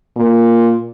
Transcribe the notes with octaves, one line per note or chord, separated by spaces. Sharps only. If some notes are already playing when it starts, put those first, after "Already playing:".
A#2